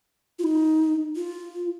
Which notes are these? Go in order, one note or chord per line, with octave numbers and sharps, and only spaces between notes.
F4
D#4
F4